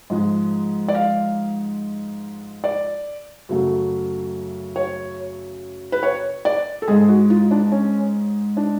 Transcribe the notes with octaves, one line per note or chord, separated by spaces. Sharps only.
G#2 F3 G#3
D5
F5
D5
F#2 C#3 F#3 A3
C#5
B4
C#5
D5
A4
G#2 G#3 G#4
F#4
F4
D4
C#4
D4